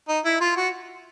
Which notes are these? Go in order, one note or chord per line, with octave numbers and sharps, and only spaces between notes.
D#4
E4
F4
F#4